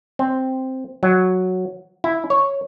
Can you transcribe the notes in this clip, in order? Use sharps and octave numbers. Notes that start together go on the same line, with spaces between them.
C4
F#3
E4
C#5